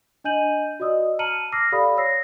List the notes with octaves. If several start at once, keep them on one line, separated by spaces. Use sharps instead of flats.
D4 D#5 G#5 G6 D#7 F#7
F#4 D5 D#5 D#6 E6
A5 A#5 F6 C#7 D#7 F#7
D6 E6 F6 A#6 C7
G4 A4 D5 F5 B5 D#6
C#5 E6 A#6 C7